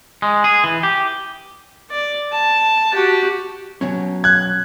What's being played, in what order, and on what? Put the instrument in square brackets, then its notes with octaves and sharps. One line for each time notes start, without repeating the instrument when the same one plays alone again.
[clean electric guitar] G#3
G#4
E3
G4
[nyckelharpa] D5
A5
F#4 G4
[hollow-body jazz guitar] B2 F#3 C#4
[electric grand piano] F#6 G#6